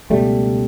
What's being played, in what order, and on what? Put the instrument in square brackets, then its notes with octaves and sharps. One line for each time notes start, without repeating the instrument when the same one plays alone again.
[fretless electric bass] C#2 B2 G3 A3